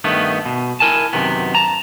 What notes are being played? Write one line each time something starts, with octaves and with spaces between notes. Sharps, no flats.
G2 D#3 A3 B3
B2
E4 A#4 G#5 A5
F#2 C3 D#3 B3
A5 A#5